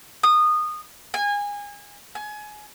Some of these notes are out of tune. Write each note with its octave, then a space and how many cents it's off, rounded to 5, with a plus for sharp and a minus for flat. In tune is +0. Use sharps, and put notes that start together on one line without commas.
D#6 -20
G#5 -25
G#5 +25